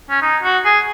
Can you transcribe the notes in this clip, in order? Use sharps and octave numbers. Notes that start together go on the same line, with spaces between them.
C#4
D#4
F#4
G#4